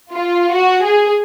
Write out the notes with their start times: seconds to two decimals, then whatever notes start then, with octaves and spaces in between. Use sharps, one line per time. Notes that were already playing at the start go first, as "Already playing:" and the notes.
0.12 F4
0.55 F#4
0.83 G#4